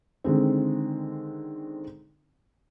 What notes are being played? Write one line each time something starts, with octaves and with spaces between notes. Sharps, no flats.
D3 D#3 G#3 C4